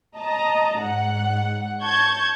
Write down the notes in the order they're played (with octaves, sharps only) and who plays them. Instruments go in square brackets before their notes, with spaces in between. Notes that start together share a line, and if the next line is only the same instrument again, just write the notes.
[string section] D#5 A5 A#5
G#2 F#5
A5 C#6 G6 G#6